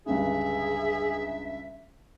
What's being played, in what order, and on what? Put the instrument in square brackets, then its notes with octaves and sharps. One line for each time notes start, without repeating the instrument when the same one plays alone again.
[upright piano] C#2 G2 D3 [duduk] G#4 [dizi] E5